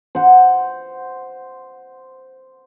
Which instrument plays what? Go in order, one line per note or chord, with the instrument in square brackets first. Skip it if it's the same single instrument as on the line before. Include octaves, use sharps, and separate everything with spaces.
[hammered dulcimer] C5 F#5